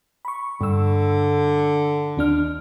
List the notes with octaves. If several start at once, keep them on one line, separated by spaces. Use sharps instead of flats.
B5 C#6
G2 D3 E6
D#2 D4 F6